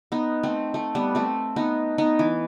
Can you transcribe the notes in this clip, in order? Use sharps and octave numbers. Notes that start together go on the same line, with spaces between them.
B3 D#4
A3 C4
A3
G3 B3
A3 C4
B3 D#4
B3 D#4
E3